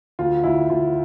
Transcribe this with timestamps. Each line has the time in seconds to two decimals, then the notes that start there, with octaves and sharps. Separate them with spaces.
0.19 D2 F4
0.43 D2 E4
0.69 D2 F4